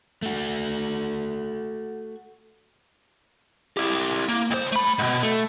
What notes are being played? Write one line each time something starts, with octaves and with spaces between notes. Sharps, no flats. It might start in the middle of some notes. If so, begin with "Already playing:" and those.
A3 F#4
E4 G4
A#3
C#2 C5
A3 B5
G#2 B2
A3